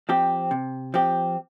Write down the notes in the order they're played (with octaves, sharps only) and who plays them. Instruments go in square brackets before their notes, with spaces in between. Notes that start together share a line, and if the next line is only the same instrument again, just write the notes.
[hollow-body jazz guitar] F3 C4 G4
C3
F3 C4 G4